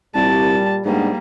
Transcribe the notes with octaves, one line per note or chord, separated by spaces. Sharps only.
C2 A#2 G3 A5
G#2 G3 A#3 B3 D4